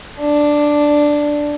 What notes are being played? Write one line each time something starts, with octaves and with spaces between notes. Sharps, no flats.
D4